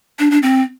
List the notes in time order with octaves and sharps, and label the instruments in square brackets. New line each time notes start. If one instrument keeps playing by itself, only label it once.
[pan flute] D4
D4
C4